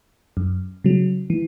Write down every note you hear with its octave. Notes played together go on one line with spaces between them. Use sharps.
F#2
C#3 F#3
E3